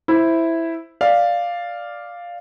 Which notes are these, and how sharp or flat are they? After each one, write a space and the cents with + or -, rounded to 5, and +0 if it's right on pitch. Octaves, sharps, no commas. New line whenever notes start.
E4 +0 C5 +0 E5 +0
D5 +0 F5 +0